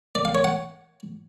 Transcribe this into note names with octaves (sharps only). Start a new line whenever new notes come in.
D5
F5
C#5
F#5